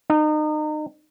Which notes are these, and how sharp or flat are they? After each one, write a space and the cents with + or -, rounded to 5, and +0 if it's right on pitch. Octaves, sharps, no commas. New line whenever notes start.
D#4 -30